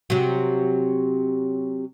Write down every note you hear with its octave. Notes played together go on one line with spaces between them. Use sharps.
C3 F#3